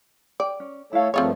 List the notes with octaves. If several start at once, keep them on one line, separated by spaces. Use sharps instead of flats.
D5 G5
C#4
A3 E4 A4 C#5 F5
G2 F3 A3 C4 F4 G#4 A#4 C#5